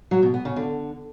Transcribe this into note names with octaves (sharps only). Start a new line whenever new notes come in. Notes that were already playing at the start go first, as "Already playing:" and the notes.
F#3
B2
B3
C#3
D3